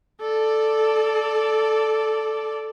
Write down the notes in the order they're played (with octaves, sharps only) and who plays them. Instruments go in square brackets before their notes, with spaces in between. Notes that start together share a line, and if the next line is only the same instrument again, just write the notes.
[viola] A4 D5